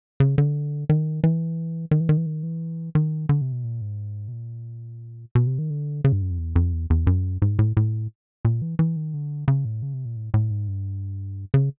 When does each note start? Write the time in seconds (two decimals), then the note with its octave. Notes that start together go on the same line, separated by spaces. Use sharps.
0.20 C#3
0.38 D3
0.89 D#3
1.24 E3
1.91 D#3
2.00 E3
2.09 D#3
2.17 E3
2.26 D#3
2.43 E3
2.95 D#3
3.29 D3
3.41 C3
3.52 B2
3.64 A#2
3.81 G#2
4.28 B2
4.33 A#2
5.35 B2
5.47 C3
5.59 D#3
5.70 D3
6.04 C#3
6.12 G2
6.22 F#2
6.31 F2
6.38 E2
6.56 F2
6.73 E2
6.90 E2
7.07 F#2
7.42 G#2
7.59 A2
7.77 A2
8.45 A#2
8.62 E3
8.79 E3
8.96 D#3
9.14 D3
9.48 C#3
9.65 A2
9.82 C#3
9.94 C3
10.05 A#2
10.16 A2
10.34 A2
10.50 G#2
10.68 G2
11.54 C#3